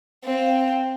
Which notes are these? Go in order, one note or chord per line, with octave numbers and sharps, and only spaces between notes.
C4 F5
F5
G5
F5
G5